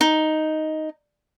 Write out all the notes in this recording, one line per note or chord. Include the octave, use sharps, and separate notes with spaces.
D#4